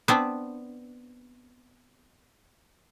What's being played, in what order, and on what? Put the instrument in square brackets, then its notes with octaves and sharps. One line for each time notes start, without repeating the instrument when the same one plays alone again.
[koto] B3 C4 D4